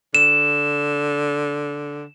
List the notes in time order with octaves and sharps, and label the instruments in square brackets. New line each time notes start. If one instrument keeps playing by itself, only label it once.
[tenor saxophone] D3 [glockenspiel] E7